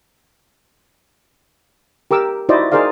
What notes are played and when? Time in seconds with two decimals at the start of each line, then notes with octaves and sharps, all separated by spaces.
2.11 G4 A#4 D6 E6
2.49 D#4 E4 F#4 C5 D5 D#5
2.72 D#4 G#4 A#4 C5 D5 F5